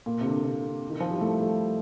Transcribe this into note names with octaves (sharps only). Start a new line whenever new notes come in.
A#2
C3
D3
C3
D#3
F3
G3
A3
A3